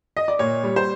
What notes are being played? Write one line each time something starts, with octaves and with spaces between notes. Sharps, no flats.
D#5
D5
A#2 C#5
G3
C5